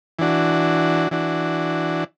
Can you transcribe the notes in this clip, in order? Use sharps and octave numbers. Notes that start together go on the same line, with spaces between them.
E3 D4 F#4
E3 D4 F#4